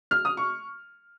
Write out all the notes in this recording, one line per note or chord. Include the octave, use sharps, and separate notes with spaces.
F6
D#6
C#6